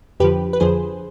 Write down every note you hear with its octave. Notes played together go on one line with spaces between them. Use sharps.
F2 D3 F3 G4 B4
B4
F2 D3 F3 G#4 C5